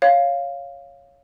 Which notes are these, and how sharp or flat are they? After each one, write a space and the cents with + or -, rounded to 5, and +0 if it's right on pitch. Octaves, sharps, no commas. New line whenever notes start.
C#5 +0 F5 +0